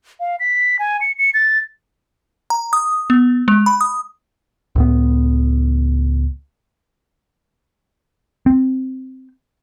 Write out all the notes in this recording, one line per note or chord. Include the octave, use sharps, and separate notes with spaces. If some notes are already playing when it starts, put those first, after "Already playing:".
F5
B6
G#5
C#7
C#7
A6
A#5
D#6
B3
G#3
B5
D#6
C#2 A2 B3
C4